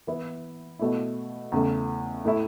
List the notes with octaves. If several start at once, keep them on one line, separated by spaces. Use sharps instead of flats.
E3 B3 E4
B2 A3 E4
E2 C#3 A3
A2 A3 E4